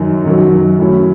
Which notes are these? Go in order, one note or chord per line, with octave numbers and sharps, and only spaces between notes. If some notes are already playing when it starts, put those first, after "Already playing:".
Already playing: F#2 D#3 F#3
F#2 D#3 F#3
A2 F#3 C#4